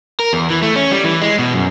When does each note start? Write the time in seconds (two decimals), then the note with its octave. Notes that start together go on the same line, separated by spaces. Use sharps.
0.20 A#4
0.33 E2
0.50 E3
0.62 A3
0.76 C#4
0.91 G3
1.04 E3
1.21 G#3
1.39 B2
1.53 F#2